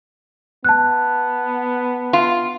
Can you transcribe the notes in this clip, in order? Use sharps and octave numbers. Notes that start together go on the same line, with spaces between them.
B3 A5 F#6
F4